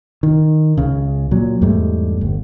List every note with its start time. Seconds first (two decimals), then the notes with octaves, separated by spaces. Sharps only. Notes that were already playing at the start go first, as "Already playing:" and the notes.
0.23 D#3
0.77 C#2 C#3
1.31 A#2 F#3
1.62 E2 G#2 G3 A3
2.21 G1